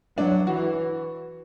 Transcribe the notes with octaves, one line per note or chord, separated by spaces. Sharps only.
F#3 D4
E3 F#4